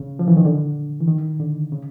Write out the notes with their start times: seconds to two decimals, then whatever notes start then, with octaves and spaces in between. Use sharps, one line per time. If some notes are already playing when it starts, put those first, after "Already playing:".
Already playing: C#3
0.19 F3
0.28 E3
0.37 D#3
0.45 D3
1.01 E3
1.08 D#3
1.40 D3
1.72 C#3